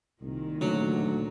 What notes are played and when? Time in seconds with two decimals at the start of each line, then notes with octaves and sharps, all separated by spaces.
0.21 C2 A#2 D#3
0.61 D2 C#3 F#3